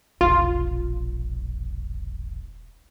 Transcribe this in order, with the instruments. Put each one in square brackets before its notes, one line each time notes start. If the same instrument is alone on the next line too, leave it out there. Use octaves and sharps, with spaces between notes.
[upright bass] E1 A#1 [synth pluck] F4